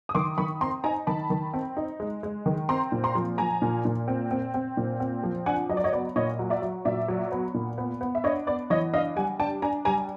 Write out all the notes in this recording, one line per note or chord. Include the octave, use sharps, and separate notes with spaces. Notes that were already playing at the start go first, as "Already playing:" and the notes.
D#6
D#3 C6 D6
D#3 B5 C#6
C4 A#5 C6
D#4 G#5 A#5
D#3 A5 B5
D#3
C4
D#4
G#3
G#3
D#3
C4 A#5 C6
A#2
A#5 C6
F3
F3 G#5 A#5
A#2
A#2
C4
C4
C4
A#2
C4
F3
D4 F#5 G#5
F#3 D#5
D5
C#5 D#5
B3 D5
A#2 C#5 D#5
F#3
D5 E5
F#3
A#2 D5 E5
F#3
B3
A#2
B3
B3
E5
D4 C#5 D#5
B3 D5
E3 C#5 D#5
D4 D#5 F5
G3 F#5 G#5
D4 G5 A5
D4 G#5 A#5
G3 G#5 A#5